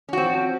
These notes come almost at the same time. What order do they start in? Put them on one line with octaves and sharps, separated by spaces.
C#4 F#4 C4 F3